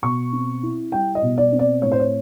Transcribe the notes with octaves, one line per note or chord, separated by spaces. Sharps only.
B2 C#6
C4
E4
G3 G5
D#5
B2
D5
C4
D5
A2 C#5
C5
C#5